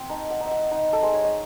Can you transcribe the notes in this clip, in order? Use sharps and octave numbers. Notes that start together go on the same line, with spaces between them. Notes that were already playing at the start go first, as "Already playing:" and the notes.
Already playing: C4 F#5
D#4 A5
F#5
D#4 E5
F#5
D#4
A4
G#3 C5
C#5
D#5